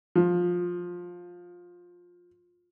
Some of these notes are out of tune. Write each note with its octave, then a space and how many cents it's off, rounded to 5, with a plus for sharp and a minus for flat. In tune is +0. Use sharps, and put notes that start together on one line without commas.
F3 +15